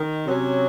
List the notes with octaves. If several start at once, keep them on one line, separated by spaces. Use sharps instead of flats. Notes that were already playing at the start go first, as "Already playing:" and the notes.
Already playing: D#3
C3 F#3 C#4